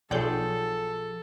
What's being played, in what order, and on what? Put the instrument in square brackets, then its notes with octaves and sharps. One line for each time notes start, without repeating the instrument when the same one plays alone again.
[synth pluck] B1 G6 [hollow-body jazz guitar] F3 G#4 [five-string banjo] F#3 D5 G5 [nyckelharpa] A4